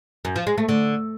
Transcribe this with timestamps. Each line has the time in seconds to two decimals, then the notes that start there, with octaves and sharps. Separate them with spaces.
0.25 F#2
0.36 F3
0.47 G#3
0.58 A3
0.69 D3